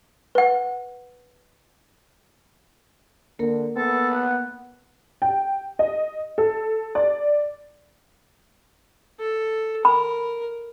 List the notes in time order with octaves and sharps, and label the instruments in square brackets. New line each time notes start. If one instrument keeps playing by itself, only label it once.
[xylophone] B4 F#5
[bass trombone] D3 [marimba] A#3 A#4
[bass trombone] B3 [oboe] A4
[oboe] F#5
[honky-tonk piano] G5
D#5
A4
D5
[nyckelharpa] A4
[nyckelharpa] A#4 [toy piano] B5